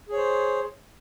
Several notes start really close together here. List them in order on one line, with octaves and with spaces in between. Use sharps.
G#4 C#5 C5